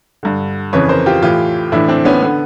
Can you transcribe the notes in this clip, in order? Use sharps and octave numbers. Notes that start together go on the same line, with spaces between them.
G2 D3
F2 C#3 E3 B4 C#5
A#4 C5
F4 G4
A2 E3 F4 G4
A2 E3 D4 E4
C4 D4
B3 C#4
D3 B3